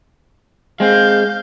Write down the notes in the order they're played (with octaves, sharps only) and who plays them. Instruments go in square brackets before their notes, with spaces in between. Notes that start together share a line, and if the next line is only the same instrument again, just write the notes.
[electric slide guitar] G#3 C4 [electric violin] F5 G6